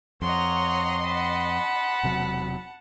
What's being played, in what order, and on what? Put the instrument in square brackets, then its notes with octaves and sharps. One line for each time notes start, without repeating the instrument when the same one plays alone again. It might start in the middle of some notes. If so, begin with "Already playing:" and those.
[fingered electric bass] F2 [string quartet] C#5 F#5 A#5 [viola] D#5 C6
[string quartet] F#5 A5 [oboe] B5
[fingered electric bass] E1 C3 F#3